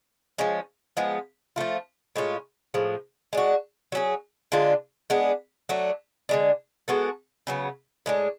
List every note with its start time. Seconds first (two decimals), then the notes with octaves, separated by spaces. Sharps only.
0.38 F3 G#3 C#4
0.97 F3 G#3 B3
1.56 F3 A3 F4
2.16 A2 G#3 C#4 F4
2.74 A2 F3 G#3
3.33 G#3 D4 F#4
3.92 F#3 C#4 G#4
4.52 D3 G#3 D4 F4
5.10 G#3 B3 D4
5.69 F#3 A3 D4
6.29 D3 G#3 D4
6.88 G#3 B3 F#4 A4
7.47 C#3 F#3 B3
8.06 A2 G#3 D4